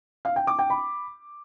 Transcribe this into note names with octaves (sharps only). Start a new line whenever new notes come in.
F5
G5
D6
G5
B5